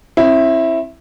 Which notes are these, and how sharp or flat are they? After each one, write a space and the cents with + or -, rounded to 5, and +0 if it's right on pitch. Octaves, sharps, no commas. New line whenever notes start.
C4 +40 E4 +0